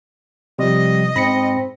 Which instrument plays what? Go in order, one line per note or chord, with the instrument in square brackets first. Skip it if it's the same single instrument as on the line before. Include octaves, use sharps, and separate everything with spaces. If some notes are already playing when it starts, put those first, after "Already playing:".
[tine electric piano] C3 F3 [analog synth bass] G3 [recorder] D#5
[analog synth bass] G#2 [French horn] C4 [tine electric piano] B5 A#6 C#7